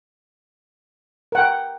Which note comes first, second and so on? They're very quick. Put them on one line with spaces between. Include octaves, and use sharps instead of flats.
A#4 F#5 G5